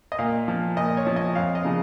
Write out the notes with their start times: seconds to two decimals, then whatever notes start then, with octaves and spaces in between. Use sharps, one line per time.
0.12 D#5
0.19 A#2 F5
0.48 F3
0.77 A#2 D#5
0.97 C#5
1.07 F3
1.16 D#5
1.35 F2 F5
1.55 D#5
1.65 C#3 F3